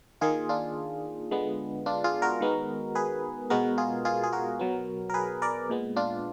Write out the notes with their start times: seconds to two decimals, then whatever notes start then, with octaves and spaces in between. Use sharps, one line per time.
0.21 D#3 A#3 F4 G#4
0.49 D4 F4
1.31 D3 G#3 B3
1.86 D4 F4
2.04 F4 G#4
2.22 F#4 A#4
2.41 D#3 G#3 B3
2.95 G#4 B4
3.50 B2 G#3 B3 F#4 A#4
3.78 F4 G#4
4.05 F4 G#4
4.23 G#4
4.32 F#4 A#4
4.59 B2 F#3 B3
5.10 A#4
5.14 G#4 B4
5.42 A#4 D5
5.70 A#2 G#3 B3
5.96 D4 F4